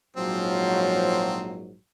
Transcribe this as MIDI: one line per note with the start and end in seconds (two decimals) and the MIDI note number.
0.17 1.78 34
0.17 1.78 44
0.17 1.61 53
0.17 1.78 54
0.17 1.61 60